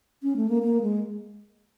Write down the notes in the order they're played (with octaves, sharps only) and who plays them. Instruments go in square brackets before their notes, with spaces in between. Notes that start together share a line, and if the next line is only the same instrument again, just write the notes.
[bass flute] C#4
A3
A#3
A#3
G#3